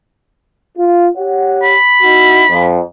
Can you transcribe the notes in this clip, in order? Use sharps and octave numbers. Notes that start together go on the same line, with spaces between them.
F4
G4 C#5 F#5
B5
D#4 E4 F#4
F2